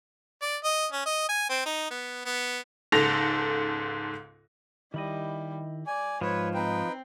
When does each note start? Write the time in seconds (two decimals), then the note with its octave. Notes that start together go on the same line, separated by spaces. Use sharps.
0.42 D5
0.64 D#5
0.92 C#4
1.06 D#5
1.29 G#5
1.50 C4
1.66 D#4
1.91 B3
2.25 B3
2.92 C#2 G#2 A4 A#6 F7
4.94 D#3 G3 E4 D#5
5.87 D5 G#5
6.21 G#2 F3 B4 C#5
6.54 C4 D#4 B4 G5